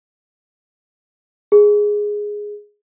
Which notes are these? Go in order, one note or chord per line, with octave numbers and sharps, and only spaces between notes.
G#4